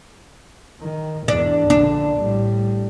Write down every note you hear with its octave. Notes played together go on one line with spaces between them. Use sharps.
D#3
E2 G#2 D4
A#1 D3 D4
A2 G3